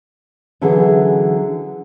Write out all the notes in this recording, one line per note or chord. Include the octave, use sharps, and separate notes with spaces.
D3 E3 F#3 C#4 E4 G#4